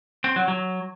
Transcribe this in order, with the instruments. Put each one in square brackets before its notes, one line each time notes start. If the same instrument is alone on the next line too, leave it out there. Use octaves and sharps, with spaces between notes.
[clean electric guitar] C4
F#3
F#3